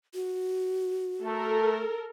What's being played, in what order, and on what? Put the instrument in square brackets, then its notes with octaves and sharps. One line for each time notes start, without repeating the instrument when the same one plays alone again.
[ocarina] F#4
[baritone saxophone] A3 [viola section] A4 A#4